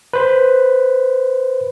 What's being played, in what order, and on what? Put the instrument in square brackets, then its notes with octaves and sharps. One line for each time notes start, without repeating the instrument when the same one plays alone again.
[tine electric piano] B4 C5